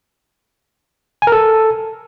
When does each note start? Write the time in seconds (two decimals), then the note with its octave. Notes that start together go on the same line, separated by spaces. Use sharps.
1.22 G#5
1.27 A#4
1.32 A4